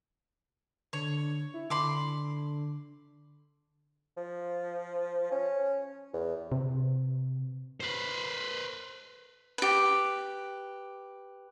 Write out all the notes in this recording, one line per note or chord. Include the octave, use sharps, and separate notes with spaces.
D3 C#5
E4
D3 B5 C6 D6
F3
C#4
E2
C3
B4 C5
G4 B4